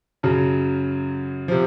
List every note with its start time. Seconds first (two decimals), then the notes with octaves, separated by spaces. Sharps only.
0.23 F#2 C#3 F#3
1.48 C3 F3